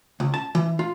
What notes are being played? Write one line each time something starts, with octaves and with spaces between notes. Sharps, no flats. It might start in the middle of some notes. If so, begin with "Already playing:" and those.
C#2
A5
E3
F4